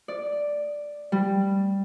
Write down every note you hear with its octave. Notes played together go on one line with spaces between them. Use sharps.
D5
G3